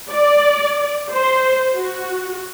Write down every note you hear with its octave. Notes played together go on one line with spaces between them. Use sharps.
D5
C5
F#4